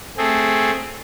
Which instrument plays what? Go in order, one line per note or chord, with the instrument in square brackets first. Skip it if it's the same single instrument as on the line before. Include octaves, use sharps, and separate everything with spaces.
[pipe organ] A3 C4 G#4